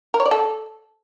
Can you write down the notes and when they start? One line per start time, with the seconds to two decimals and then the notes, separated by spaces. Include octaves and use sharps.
0.14 A#4
0.20 C#5
0.26 D5
0.31 A4